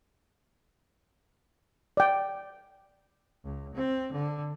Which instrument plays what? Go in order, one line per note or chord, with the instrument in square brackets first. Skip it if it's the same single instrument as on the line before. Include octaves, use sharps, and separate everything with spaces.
[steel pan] D5 G5
[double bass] C#2
C4
D3